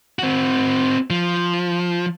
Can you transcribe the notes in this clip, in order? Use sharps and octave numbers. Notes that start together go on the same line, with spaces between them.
C4 F#4
F3